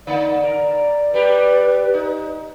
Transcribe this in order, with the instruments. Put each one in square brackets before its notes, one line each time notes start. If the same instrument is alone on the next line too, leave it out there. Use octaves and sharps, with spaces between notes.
[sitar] D3 A#3 D#4 [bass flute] D5
[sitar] A#4
[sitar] G3 G4 [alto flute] B4
[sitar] D#4